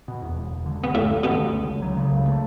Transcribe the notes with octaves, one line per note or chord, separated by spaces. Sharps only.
B2
E2
E1
E1
D3
D2 B3
F#2 A2 A3
F#2
B2 A3 B3
D3
C#2
C#2
F#3
C#3
C#2
A3